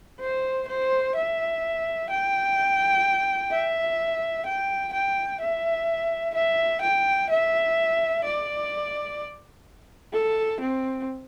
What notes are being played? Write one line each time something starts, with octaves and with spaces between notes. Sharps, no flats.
C5
C5
E5
G5
E5
G5
G5
E5
E5
G5
E5
D5
A4
C4